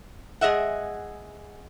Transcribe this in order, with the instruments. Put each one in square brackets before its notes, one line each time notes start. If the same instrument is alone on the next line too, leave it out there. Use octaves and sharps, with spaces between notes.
[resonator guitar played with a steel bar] G#3 G#4 D#5 E5 F#5